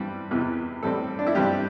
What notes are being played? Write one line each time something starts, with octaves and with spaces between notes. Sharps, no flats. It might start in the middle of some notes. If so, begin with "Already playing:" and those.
Already playing: G2 E3 G3 C4
E2 C3 E3
A2 G3 C4 A4
D4
E4
G2 G3 C4 G4